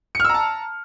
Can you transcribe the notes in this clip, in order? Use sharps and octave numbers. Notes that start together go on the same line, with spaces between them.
A5 A#5 E6 F6 C#7